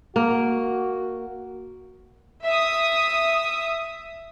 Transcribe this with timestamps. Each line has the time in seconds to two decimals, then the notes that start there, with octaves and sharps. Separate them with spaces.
0.16 A#3 F#4
2.45 E5 D#6